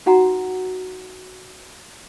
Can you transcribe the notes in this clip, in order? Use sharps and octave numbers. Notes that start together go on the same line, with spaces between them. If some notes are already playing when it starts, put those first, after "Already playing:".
D#4 F#4 F#5 A#5